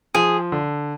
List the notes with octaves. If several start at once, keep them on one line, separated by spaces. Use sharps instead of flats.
F3 G#4
D3